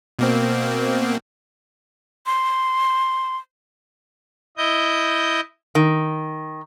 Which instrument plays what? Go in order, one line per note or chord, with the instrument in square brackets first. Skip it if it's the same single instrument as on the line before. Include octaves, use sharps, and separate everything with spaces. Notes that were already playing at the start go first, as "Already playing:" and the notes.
[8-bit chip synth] B2 A#3 C4
[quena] C6
[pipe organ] E4 D#5 G6
[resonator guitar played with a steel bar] D#3